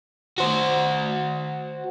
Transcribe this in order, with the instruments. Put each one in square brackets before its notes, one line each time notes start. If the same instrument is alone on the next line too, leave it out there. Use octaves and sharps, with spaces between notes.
[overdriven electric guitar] F#4 C5